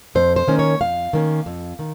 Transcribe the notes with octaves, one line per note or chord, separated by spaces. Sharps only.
F2 C5
C5
D#3 A#3 C#4
C#5
F2 F5
D#3 A#3 C#4
F2
D#3